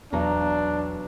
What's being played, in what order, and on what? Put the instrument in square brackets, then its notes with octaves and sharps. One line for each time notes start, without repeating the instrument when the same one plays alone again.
[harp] B1 A#5 [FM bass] E2 [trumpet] D4